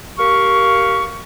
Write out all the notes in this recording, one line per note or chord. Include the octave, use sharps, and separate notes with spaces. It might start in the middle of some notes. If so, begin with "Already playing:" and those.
A#3 G4 F5 C#6